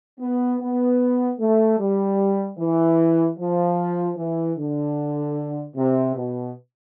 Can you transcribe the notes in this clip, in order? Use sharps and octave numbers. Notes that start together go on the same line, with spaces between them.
B3
B3
A3
G3
E3
F3
E3
D3
C3
B2